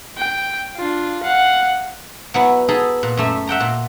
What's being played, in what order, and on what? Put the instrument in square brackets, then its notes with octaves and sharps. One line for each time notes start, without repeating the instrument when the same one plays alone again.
[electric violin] G5
D4 F4
F5 F#5
[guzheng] F#3 B3 E4
D#4 G#4 A4 B5
A#2
F#2 A3 E5
E5 F#5 G5 A#5
A#2